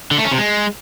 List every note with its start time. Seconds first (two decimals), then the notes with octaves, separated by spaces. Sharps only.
0.11 D3
0.18 A3
0.25 C#4
0.31 C3
0.38 G#3